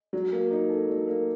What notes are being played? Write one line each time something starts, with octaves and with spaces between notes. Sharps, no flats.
F#3
A#3
D#4
A4
F#3
A#3